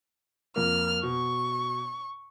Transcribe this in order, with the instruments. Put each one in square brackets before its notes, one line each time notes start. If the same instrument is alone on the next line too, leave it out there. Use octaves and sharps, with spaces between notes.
[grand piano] F2 A#3 [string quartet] F6
[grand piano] B2 [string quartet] C#6